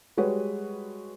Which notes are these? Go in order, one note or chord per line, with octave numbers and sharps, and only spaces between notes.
G3 G#3 F#4 B4 C#5